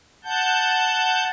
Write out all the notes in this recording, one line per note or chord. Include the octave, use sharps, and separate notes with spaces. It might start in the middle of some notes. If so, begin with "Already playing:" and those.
F#5 A5 G6